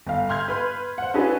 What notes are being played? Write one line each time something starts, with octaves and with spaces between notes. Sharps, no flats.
G1 F5
C6 F6 G6 G#6
B4 B5 C6
C5 F#5
C#4 D4 E4 F#4 G#4 B4